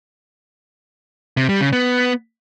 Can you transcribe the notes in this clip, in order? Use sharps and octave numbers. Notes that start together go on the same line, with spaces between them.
C3
G3
C#3
B3